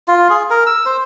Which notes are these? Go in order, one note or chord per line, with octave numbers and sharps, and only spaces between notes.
F4
G#4
A#4
E6
C5